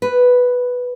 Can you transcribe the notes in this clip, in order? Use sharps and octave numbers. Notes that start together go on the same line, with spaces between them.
B4